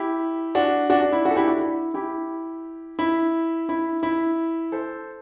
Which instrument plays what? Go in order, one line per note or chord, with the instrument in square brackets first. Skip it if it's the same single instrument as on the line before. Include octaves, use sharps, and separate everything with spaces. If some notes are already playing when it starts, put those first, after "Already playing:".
Already playing: [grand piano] E4 G4
D4 F#4
D4 F#4
D4
E4
D4 F#4
A4
E4 G4
D4 F#4
E4
E4 G4
E4
E4
E4
A4 C5